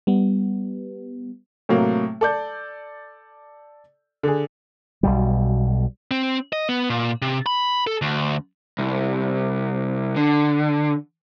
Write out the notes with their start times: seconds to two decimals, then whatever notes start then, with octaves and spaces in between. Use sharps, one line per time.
0.07 G3 B3
1.69 A2 C3 F#3 A#3
2.21 A4 D5 G6
4.23 D3 G#4
5.03 B1 B2 G3
6.11 C4
6.53 D#5
6.69 B3
6.90 A#2
7.22 C3
7.46 B5
7.87 A4
8.02 D2
8.79 C2
10.16 D3